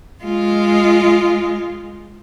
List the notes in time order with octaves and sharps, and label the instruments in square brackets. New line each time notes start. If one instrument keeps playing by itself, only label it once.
[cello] G#3 F4